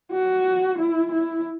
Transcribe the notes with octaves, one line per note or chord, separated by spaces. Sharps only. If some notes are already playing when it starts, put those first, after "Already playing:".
F#4
E4
E4